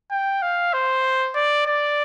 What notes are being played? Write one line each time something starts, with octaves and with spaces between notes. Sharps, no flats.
G5
F5
C5
D5
D5